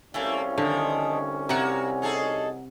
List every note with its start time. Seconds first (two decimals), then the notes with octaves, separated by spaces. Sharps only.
0.14 C2 A3 A#3 C#4 E4 F4 G#4
0.58 D3 D#3 F3
1.49 C3 A#3 F#4 F#5 A#5 C#6
2.02 D#4 G#4 A4